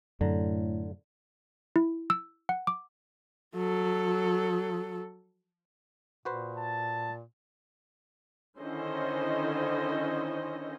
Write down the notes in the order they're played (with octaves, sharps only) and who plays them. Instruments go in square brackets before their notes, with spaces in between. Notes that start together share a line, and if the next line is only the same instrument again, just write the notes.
[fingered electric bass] F#2 [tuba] A2 [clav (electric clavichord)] D3 A#5
[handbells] E4
E6
F#5
D6
[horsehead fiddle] F#3 A4
[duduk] A#2 [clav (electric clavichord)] F#4 B4 C5
[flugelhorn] A5
[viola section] D3 D#3 C#4 E4 C5 D#5